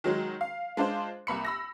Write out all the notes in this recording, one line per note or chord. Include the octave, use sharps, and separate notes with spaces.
D#3 F#3 G#3
F5
G#3 D4 F4 C5
C2 A#3 B5 C#7
B5 E6 A#6